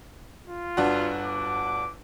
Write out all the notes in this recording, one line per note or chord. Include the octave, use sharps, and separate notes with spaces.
F4
G1 D4 F#4
D6